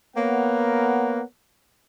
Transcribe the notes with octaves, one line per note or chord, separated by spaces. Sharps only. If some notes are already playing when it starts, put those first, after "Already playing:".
A#3 B3 A#4 C#5 F#5